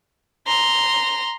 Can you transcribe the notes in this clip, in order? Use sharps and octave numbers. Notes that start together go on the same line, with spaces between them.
A#5 C6